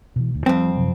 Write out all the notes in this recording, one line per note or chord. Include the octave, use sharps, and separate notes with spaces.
B2 E3
D2
F2 F3 G3 C4
F#2 C3 F#3